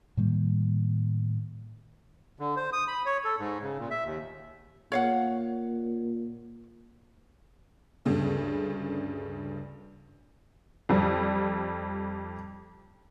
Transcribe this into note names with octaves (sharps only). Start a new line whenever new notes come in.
A2 D#3 G3 A#3
D3
C5
D#6
B5
C#5
A4
G#2
C#3
A#2
E5
D#2
A#2 C#5 F5 F#5
D2 G2 C#3 G#3
F2 G3